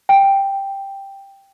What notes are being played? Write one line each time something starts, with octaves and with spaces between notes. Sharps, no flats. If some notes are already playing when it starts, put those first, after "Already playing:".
G5